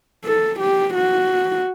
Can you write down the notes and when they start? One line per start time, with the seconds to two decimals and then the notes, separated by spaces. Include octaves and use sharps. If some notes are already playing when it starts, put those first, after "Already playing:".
0.25 A4
0.60 G4
0.95 F#4